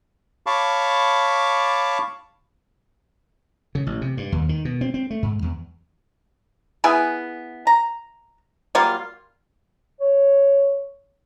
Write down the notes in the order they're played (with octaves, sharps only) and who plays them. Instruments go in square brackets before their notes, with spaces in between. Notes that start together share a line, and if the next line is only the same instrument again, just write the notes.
[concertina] C#5 F5 A5 B5 C#6 D6
[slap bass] C#3
A1
C3
G2
D#2
D#3
B2
C4
C4
A3
G#2
E2
[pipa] B3 E4 G#4 G#5
A#5
F#3 G3 A#3 F4
[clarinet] C#5